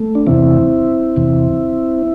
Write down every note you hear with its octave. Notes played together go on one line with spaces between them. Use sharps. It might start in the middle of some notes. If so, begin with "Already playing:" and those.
Already playing: A3
D4
E2 C3 E3 C4 E4
E2 C3 E3